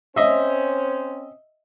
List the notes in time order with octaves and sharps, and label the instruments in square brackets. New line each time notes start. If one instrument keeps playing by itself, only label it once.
[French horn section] C4 C#4 C5 [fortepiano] D#5 E5